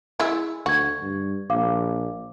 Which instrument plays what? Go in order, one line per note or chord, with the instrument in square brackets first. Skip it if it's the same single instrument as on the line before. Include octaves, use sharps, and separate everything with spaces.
[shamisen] G#3 E4 E5 [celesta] E6
[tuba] D2 [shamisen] F#4 [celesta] C#6 G#6
[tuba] G2
[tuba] A#1 [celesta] F5 D6